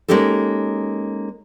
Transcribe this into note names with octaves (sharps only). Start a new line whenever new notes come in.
G#3 A#3 C#4 D#4 G4 A4